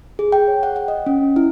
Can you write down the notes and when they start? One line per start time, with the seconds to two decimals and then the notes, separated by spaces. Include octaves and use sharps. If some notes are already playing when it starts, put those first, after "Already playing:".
0.19 G#4
0.32 G5
0.48 C#5
0.63 F#5
0.76 F#5
0.88 D#5
1.06 C#4
1.36 E4